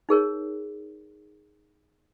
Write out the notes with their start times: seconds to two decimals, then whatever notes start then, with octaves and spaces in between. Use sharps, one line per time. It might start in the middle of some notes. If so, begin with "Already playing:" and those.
0.09 D#4 G#4 A#4 C#5